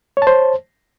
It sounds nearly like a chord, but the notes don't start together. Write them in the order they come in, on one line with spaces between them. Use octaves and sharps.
C#5 A5 C5